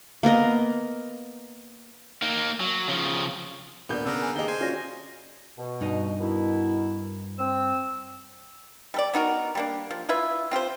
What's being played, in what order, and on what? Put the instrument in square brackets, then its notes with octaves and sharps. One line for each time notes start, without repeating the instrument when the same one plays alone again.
[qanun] A#3 B3 A#4 D#5
[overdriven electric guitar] A#3 D#4
F#3
C#3 F3
[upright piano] D#1 A#3 G6 [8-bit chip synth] B3 [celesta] D4 D5
[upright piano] C#3 [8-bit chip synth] B3 D4 A#4 [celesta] E6
[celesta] G#5
[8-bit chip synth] D#3 A#3 [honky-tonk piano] G4 D#5 [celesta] G#4 G7
[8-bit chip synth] C5 G#5
[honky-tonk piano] C#4 F4 G#4 [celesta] F#4 D5 A#6
[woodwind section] B2
[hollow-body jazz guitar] G2 D#4 D#5
[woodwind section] B2 D#3 E4
C4 E6
[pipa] G3 A4 D5
B3 D#4 F#4 A#4
G3 A#3 D4
F3
E4 F4 B4 E5
C4 F4 G4 C5